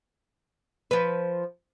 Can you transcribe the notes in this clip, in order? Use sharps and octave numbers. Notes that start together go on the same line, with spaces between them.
F3 B4